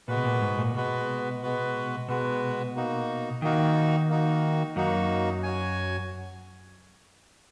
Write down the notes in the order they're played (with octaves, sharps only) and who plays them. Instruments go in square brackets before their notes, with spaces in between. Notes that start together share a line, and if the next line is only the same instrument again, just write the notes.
[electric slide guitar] A#2 [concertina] G#3 B3 F#4 B4
[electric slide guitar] B2
A#2
G#2
A#2
[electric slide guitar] B2 [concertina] G#3 B3 F#4 B4
[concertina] G#3 B3 F#4 B4
[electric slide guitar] B2 [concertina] G#3 B3 F#4 B4
[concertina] A#3 D#4 F#4
[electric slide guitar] D#3 [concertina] A#3 D#4 F#4
[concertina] A#3 D#4 F#4
[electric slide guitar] F#2 F#3 [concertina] A#3 D#4 F#4
[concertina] F#4 C#5 G#5